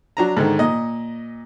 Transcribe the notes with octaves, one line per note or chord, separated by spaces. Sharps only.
F#3 D4 A#5
G#2 D3 D#3
A#2 D#5